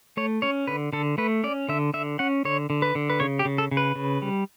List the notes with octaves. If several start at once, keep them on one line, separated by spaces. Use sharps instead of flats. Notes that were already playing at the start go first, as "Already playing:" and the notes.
A3 C#5
C#4 C#5
D3 B4
D3 A4
A3 B4
C#4 D5
D3 E5
D3 E5
C#4 F#5
D3 C#5
D3
B4
D3
B4
C#3 C#5
G4
C#3
A4
C#3
B4
C#3
G3